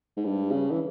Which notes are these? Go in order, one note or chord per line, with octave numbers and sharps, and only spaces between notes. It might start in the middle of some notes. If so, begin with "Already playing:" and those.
G#2
G2
C#3
E3